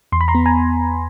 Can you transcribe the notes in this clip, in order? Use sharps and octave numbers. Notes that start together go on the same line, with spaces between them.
E2 C6
B5
A#5 C6
B3
G#5 A#5